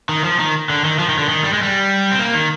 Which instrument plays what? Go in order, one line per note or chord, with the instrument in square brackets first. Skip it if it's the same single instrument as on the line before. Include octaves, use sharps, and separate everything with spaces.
[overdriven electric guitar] D#3
F3
D#3
D3
D#3
F3
D#3
D3
D#3
G3
G#3
G3
C4
A#3
D#3